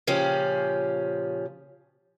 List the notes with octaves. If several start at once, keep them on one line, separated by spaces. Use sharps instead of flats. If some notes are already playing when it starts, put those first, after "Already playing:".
A#2 C#3 F3 C#4 G4 C5